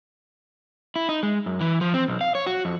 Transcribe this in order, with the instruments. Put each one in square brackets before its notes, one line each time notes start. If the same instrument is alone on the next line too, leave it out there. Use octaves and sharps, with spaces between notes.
[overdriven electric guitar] E4
D#4
G#3
F#2
E3
F3
C4
B1
F5
C#5
F#4
F2